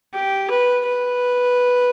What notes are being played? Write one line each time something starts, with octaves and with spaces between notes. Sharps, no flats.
G4
B4
B4